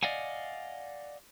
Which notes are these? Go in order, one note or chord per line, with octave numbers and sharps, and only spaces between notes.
D5 D#5 F5 F#5 G#5